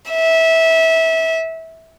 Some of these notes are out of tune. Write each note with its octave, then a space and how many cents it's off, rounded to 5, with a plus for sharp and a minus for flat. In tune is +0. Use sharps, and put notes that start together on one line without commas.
E5 -20